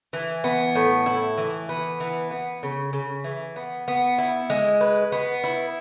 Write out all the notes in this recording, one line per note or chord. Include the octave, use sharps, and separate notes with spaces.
E3
B3
A2
E4
E3
B3
E3
B3
C#3
C#3
E3
B3
B3
E4
G#3
B4
B3
E4